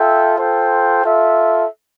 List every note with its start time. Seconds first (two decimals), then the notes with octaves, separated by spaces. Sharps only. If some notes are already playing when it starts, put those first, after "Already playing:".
Already playing: F4 A4 E5 G5
0.39 F4 A4 C5 G5
1.03 F4 A4 E5